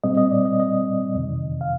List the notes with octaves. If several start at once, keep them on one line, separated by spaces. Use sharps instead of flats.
A#2 G3 C4 D#5
D#5
D5
D#5
D#5
F2 C3 D#3
F5